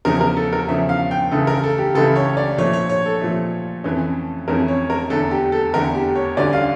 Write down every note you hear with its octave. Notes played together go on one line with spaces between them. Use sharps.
E2 C#3 F3 A3 C#4 A#4
A#4
A4
A#4
E2 C#3 F3 A3 C#4 E5
F5
G5
C#2 C#3 E3 A3 A4
A#4
A4
G4
C#2 C#3 E3 A3 A4
C#5
D5
A#2 F3 A3 C#5
C#5
C#5
A4
A#2 F3 A3
F2 E3 A3 C#4
F2 E3 A3 C#4 A#4
C#5
A#4
E2 D3 A3 A4
G4
A4
E2 D3 A3 A#4
G4
C#5
D2 D3 G3 C#4 D5
F5